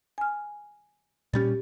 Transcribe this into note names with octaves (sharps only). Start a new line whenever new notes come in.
G#5 F6
A#2 G3 C#4 G4 A6